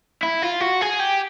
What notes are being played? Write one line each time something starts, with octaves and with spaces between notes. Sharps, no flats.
E4
F4
F#4
G#4
G4